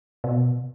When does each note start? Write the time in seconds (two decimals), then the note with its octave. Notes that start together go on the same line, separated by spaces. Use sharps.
0.24 B2